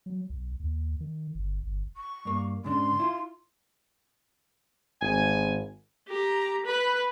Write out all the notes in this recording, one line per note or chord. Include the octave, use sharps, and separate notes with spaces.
F#3
B1
D#2
D#3
G1
G1
C#6
G2 A#3
G#2 C#3 D4 C6
E4 F4
G#1 G#5
G4 A#5
B4 B5